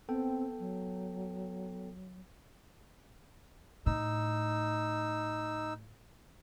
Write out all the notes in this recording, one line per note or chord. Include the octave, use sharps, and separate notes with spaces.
B3 C4 A4 G5
F#3
A2 D#4 E6